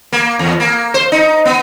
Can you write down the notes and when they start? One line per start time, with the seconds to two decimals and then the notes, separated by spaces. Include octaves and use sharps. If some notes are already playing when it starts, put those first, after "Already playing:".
0.13 A#3
0.39 E2
0.60 A#3
0.94 C5
1.12 D#4
1.45 B3